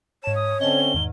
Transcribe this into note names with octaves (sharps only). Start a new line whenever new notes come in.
G#2 C#5 A5 E7
D#6
D3 C4 C#4 D#5 A5 G7
E2 G#2 D#3